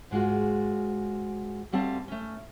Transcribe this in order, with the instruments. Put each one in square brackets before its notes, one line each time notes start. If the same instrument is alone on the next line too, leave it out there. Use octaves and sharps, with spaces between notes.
[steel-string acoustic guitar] G#2 G#3 F4 F#4
D2 G3 C4 F5 A5
A3 C#4